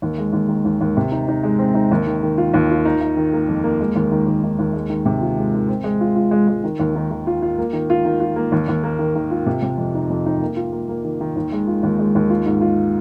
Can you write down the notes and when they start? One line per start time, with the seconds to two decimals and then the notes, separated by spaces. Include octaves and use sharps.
0.02 D#2
0.18 G#3
0.33 D#2
0.48 D#3
0.65 D#2
0.81 D#2
0.97 C3
1.11 D#4
1.28 D#4
1.43 G#3
1.59 C4
1.74 D#4
1.91 D#2
2.07 D#3
2.23 D#3
2.38 F4
2.54 D#2
2.70 F4
2.85 D#4
3.01 D#4
3.17 D#3
3.33 A#3
3.48 F2
3.64 A#3
3.80 G#3
3.96 D#2
4.11 D#3
4.26 D#2
4.43 D#3
4.59 D#2
4.74 G#3
4.90 D#3
5.05 C3
5.21 F4
5.37 G#3
5.54 D#3
5.68 C4
5.84 G#3
6.01 F4
6.15 F4
6.31 G#3
6.48 G#3
6.64 D#3
6.79 D#2
6.95 D#3
7.11 D#3
7.27 F4
7.42 F4
7.58 A#3
7.73 D#3
7.90 F4
8.05 D#3
8.20 F4
8.36 A#3
8.52 D#2
8.68 D#2
8.83 A#3
8.99 D#3
9.15 D#3
9.31 F4
9.46 C3
9.62 C3
9.78 F2
9.95 D#4
10.10 F2
10.26 D#4
10.41 A#3
10.56 F4
10.72 A#3
10.89 A#3
11.04 D#3
11.21 D#3
11.36 D#2
11.52 G#3
11.67 F4
11.83 D#2
11.99 G#3
12.15 D#2
12.30 F4
12.46 G#2
12.61 F4